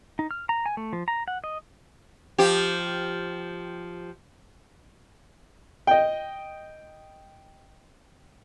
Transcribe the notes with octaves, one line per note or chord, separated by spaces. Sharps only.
D#4
F6
A#5
G#5
A3
F3
A#5
F#5
D#5
F3 G4
D#5 G5